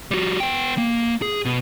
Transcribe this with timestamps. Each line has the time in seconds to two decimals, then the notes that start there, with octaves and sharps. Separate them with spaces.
0.11 G3 F#4
0.40 B3 G5
0.78 A#3
1.22 G#4
1.45 B2